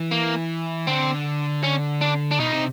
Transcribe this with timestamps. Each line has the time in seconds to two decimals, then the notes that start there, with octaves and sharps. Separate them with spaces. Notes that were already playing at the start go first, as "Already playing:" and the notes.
Already playing: E3
0.11 A#3
0.87 D3 C4
1.63 C#4
2.01 D4
2.31 D4
2.40 B2 D#4
2.53 C3